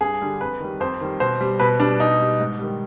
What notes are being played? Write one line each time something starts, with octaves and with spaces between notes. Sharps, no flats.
G2 G#4
D3 G3
F2 B4
D#3 G3
F2 C5
D#3 G3
B2 C5
G3
B2 B4
G3 D4
B2 D#4
G3
G#2
D#3 G3